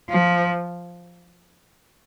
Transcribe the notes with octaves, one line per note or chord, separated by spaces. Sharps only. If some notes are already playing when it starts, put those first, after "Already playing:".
F3